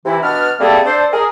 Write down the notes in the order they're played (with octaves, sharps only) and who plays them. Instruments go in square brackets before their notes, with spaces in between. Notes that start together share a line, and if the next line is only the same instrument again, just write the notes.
[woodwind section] C3 E3 E4
B2 B3 D4 F6
G3 A3 A#3 C4 G#4 A4
D4 A4 C5
G#4 A#4